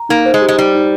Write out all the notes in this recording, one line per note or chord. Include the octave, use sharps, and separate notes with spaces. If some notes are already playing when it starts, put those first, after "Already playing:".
Already playing: A#5
A#3 D#4
C5
G#3
G4
G#3
G3 D#4
D#4